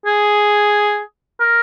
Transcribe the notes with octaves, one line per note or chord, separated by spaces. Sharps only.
G#4
A#4